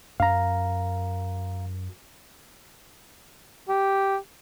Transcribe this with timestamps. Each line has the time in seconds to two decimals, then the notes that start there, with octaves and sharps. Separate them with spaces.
0.20 F#2 F5 A#5
3.68 G4